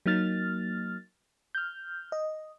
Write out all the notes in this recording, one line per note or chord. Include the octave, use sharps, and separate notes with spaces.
F#3 A#3 D#4 F6 A6
F6 G6
D#5